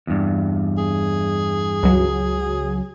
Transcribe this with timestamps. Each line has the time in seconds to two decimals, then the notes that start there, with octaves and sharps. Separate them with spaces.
0.07 E2 G2
0.78 G#4
1.83 C#2 F#3